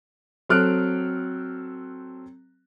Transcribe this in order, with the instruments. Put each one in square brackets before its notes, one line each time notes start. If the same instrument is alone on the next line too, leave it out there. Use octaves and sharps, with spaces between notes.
[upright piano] F#3 C4 A4 F6 F#6 D7